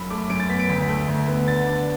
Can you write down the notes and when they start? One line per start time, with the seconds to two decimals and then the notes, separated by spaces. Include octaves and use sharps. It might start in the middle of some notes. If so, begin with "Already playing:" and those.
Already playing: F#2 B5
0.10 A3 D6
0.30 F#2 D7
0.40 A6
0.49 B3 B6
0.59 D7
0.69 D2 B6
0.89 A3
1.08 D2
1.28 B3
1.47 D3 A6
1.67 D4